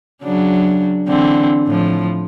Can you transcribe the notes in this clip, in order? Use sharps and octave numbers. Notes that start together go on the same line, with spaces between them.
C#3 F#3 D4
D3 E3 C4
A2 F3